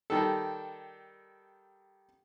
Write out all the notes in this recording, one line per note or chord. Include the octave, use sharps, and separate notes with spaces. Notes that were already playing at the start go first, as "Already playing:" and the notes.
D#3 G3 A4